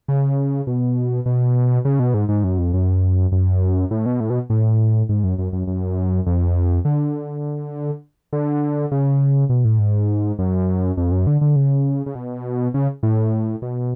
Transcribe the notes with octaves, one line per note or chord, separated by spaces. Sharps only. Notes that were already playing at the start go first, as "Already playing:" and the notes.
C#3
B2
B2
C#3
B2
G#2
G#2
F#2
F2
F#2
F#2
A2
B2
A2
B2
A2
G#2
F#2
F#2
F#2
F#2
F2
D3
D3
C#3
B2
A2
G#2
F#2
F2
F#2
D3
D3
C#3
C#3
B2
C#3
A2
B2